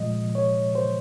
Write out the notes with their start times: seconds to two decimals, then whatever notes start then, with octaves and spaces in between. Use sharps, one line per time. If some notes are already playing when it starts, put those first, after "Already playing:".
Already playing: A#2 F3 G#3 D#5
0.35 C#5
0.75 C5